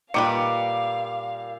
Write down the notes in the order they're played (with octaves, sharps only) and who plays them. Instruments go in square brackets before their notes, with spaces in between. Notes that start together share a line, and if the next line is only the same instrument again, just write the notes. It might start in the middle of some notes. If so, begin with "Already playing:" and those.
[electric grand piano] A#2 D6 C#7 [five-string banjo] D#3 G3 B4 [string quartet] F5